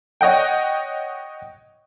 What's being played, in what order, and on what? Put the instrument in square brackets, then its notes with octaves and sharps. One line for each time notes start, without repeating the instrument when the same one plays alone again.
[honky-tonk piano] C#5 D#5 F#5 G5